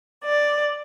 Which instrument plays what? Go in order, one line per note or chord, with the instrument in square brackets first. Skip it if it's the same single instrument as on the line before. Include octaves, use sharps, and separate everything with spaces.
[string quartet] D5